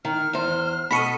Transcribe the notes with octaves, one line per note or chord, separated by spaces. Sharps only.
D#3 F6
E2 C5
B2 A4 B5 C#6 D#6